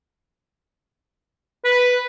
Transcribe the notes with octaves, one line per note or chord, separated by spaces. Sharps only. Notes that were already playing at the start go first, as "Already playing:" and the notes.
B4